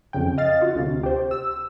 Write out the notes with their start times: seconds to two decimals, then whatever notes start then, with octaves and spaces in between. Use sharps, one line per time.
0.13 F2 C#3 G5
0.38 D#5 F5 A6
0.61 F4 F#4
0.76 D2 C3
1.03 G4 C5
1.31 E6